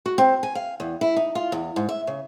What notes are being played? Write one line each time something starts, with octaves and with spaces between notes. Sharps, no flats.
F#4
C4
G#5
F5
E2
E4
D#4
F4
E2
G#2
E5
C#3